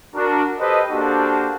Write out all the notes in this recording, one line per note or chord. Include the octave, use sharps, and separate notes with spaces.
D4 F#4 A#4
G4 A4 B4 C5 D#5
A#3 D4 F#4 G4 A4 C5